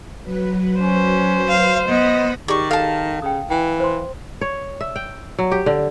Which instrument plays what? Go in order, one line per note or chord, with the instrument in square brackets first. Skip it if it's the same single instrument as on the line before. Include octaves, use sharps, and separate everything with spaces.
[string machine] F#3 B4
[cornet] C#4 [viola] C5
[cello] F5
[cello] B3 [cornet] D#5 [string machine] B5 D#6 A#6
[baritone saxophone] D#3 [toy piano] G4 G#4 [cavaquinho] D5 C#6
[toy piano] A4 [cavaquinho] F5 A5
[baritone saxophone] C#3 [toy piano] G5 D#6
[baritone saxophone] E3 [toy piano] G5
[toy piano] C5 C6
[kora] C#5
E5
G5
F#3
G4
D3